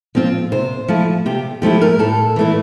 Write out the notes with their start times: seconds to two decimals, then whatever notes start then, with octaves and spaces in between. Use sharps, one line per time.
0.15 F3 C4 F4
0.52 C3 C5
0.88 F3 A3 E4
1.26 C3 G4
1.62 F3 A3 E4 G4
1.81 A#4
1.99 A2 A4
2.36 E3 A3 E4